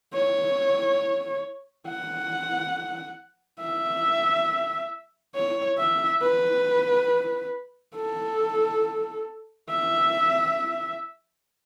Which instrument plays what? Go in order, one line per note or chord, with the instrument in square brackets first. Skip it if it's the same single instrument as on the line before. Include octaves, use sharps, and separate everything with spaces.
[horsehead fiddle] C#5
F#5
E5
C#5
E5
B4
A4
E5